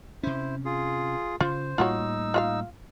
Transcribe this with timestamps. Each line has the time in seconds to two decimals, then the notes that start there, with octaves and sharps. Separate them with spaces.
0.23 C3 C#4 E4 C5
0.65 F4 G#4
1.40 C#3 F4 C5
1.78 A2 G3 A#3 D#4 F4 F#4 C#5 E6
2.34 F4 E5 F5